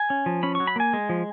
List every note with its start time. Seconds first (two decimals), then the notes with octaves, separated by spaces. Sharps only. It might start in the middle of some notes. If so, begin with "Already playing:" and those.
Already playing: G#5
0.10 C#4
0.26 F3
0.43 C#4 B5
0.55 F#3 C#6
0.67 B5
0.76 A#3 G#5
0.93 G#3
1.09 F3